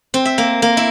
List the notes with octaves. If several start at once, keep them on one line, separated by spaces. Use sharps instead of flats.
C4
E5
A#3
A#3
E4